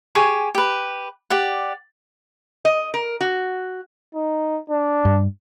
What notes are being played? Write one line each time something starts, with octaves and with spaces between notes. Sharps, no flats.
G4 G#4 G#5 C#6
G4 B4
G4 D5 F#5
D#5
A#4
F#4
D#4
D4
G2